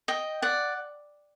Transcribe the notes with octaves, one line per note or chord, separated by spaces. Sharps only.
D#5 G5
D5 F#5